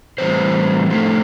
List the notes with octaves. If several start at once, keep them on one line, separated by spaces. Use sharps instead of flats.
A2 E3 G3 C4 C5
A2 F3 A3